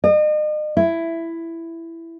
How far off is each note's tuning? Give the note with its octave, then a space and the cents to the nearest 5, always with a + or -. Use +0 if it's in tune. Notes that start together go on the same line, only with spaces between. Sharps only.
D#5 -40
E4 +10